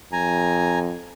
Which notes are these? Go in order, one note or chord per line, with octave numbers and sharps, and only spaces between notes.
F2 G#5 A#5